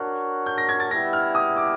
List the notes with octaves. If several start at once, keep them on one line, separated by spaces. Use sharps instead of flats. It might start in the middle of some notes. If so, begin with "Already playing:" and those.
Already playing: D4 F#4 A#4 C#5 F#6
G6
A#6
G#6
A6
G3 B3 E4 A#6
F6
D#6
D6